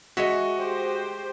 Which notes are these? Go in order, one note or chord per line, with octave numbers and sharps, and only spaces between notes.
G#3 F#4 C#5 D#5 E5
G4 C5